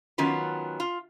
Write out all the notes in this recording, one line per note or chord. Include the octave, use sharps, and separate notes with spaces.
D#3 F#3 B3 C#4 F4
F4